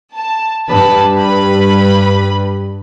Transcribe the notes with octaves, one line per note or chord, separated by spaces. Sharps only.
A5
G2 B4 A5 B5
B4 B5